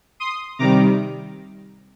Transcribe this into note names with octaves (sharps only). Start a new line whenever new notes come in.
C6 D#6
C3 D#3 G3 A#5 D6